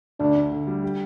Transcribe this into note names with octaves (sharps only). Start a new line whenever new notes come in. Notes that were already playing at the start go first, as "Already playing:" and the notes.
D2 D4
D3
D3
G3
G4